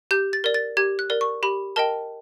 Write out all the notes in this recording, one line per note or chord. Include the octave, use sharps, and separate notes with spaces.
G4 G6
A6
A#4 D5
A6
G4 G#6
F#6
A#4 D5
C#6
G4 B5
A#4 D#5 G5 A5